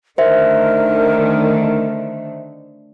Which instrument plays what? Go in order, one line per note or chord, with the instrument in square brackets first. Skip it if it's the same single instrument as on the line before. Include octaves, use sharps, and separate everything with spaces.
[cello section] D3 D#3 A3 [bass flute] A#4 [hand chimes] C5 E5